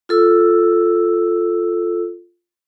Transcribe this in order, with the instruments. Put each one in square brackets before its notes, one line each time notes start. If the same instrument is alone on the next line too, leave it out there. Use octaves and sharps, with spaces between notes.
[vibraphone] F4 A4 E6